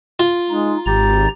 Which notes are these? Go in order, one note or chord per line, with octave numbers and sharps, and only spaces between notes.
F4
G#3 D#4
G#1 G4 A#5 A6